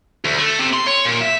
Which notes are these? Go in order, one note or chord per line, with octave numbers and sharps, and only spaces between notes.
D2
A3
C3
C6
C#5
A#2
E5